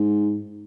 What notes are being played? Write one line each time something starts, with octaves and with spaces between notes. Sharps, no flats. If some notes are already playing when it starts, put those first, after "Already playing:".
Already playing: G#2